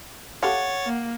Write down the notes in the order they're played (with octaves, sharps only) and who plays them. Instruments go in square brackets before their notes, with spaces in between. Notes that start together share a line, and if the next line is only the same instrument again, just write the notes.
[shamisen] G4 A4 F5 [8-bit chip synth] C#5 A6 [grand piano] F#5
[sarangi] A#3